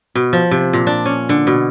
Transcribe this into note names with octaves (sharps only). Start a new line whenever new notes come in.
B2
F3
C3
A#2
D4
C#4
D3
B2